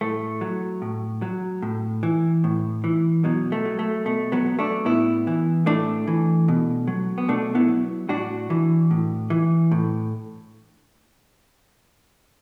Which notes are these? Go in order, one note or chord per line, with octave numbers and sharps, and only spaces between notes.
A2 A3
F#3
A2
F#3
A2
E3
A2
E3
B2 F#3
A3
F#3
A3
B2 A3
F#3 B3
F#3
A3 D4
A2 B3 E4
E3
A2 A3 D4
E3
B2
F#3
B3
B2 A3 D4
B3 E4
F#3
A2 D4 F#4
E3
A2
E3
A2